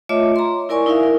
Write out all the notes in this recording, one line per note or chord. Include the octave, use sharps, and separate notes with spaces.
A3 F4 C#5 D#5 E5 D6
A#5 C6
E4 A#4 D5 G#5 C#6
D#4 E4 A#4 E5 F5
E4 A#4